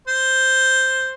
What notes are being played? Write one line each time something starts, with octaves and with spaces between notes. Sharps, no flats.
C5